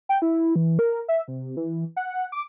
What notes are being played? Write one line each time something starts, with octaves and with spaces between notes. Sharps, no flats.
G5
E4
E3
A#4
E5
C3
E3
F#5
D6